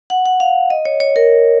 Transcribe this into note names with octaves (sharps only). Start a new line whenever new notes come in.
F#5
F#5
F5
D#5
C#5
C#5
A#4